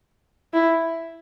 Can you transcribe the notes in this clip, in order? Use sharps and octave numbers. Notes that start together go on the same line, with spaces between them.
E4